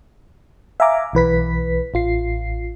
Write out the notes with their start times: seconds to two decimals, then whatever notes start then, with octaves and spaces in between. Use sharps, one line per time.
0.80 E5 F5 G#5 A#5 D6
1.13 B1 E3 B4 B6
1.94 A1 F4 C7